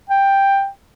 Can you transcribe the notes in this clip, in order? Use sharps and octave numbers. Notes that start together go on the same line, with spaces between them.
G5